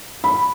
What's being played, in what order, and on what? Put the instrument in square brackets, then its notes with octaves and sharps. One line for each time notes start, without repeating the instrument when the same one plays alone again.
[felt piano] B5